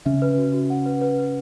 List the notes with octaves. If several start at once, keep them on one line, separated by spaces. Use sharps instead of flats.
C#3 C#4 E5
B4
F#4
F#4
F#5
B4
B4
B4